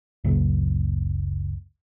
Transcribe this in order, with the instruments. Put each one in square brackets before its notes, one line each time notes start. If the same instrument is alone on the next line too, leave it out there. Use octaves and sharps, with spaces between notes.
[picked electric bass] F#1 C#2